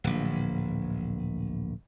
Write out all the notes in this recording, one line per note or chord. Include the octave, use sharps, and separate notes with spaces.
D1 A#1